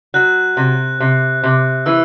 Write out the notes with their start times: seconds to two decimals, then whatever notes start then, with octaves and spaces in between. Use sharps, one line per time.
0.14 F#3 F#6
0.57 C3
1.00 C3
1.43 C3
1.86 E3 E6